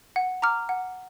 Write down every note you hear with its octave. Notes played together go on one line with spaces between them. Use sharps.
F#5
A#5 D6 F6
F#5